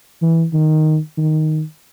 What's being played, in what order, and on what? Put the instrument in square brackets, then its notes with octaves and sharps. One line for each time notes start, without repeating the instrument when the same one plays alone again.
[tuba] E3
D#3
D#3